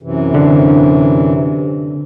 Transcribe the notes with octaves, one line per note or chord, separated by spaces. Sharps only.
F#2 C3 E3
D3